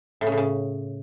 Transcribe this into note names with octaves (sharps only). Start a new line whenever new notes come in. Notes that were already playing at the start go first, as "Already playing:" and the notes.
A2
C#3
A2
C#3